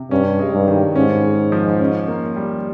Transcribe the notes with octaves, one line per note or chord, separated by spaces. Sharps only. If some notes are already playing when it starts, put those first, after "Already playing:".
Already playing: C3
G2 C#4
G#3
G2
D#3
G#2 C#4
G#3
F3
C#4
A#3
G3